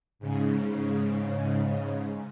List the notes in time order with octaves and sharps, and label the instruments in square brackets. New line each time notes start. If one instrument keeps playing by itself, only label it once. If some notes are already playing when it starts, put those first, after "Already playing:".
[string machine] G#2 C#3